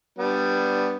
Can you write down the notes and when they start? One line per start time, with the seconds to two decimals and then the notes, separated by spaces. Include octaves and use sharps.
0.19 G3 B3 D4